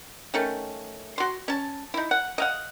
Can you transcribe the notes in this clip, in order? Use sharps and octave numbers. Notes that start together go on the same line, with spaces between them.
D#3 A3 C#4
F#4 C6
C#4 A5
D#4 E4
F#5
D#5 F5 F#5